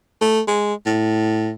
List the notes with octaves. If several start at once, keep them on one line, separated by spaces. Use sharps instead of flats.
A3
G#3
A2